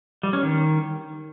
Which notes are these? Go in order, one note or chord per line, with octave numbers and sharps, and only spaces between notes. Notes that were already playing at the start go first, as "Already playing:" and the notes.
G3
C#4
D#3